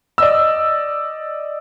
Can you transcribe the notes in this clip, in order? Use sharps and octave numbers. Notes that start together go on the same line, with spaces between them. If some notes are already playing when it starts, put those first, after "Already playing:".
D5 D#5 E6